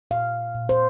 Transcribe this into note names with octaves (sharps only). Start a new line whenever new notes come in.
A#2 F5
A#2
C5